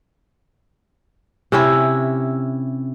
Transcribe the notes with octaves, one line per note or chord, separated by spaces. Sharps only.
C3 C#4 E4